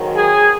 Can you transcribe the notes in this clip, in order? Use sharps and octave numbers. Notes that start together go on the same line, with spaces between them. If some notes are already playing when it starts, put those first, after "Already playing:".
Already playing: G#2 D#3 F#3
G#4